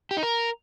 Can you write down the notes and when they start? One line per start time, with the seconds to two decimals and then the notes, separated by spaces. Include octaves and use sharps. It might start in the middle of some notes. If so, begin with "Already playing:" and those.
0.11 G4
0.17 D#4
0.23 A#4